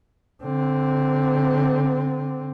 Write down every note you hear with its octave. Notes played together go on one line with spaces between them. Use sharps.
D3 C4